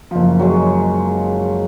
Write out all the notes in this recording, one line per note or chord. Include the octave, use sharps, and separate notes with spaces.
F#1 F3
F#3 G#3